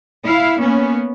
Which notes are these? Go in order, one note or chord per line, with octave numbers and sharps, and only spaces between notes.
E4 F5
A#3 B3 C#4